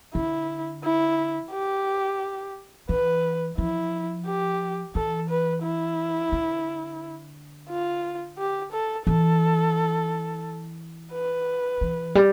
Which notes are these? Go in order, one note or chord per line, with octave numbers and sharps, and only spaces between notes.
D3 E4
E4
G4
E3 B4
F3 E4
G4
E3 A4
B4
E4
D3
F4
G4
A4
E3 A4
B4
E3
G3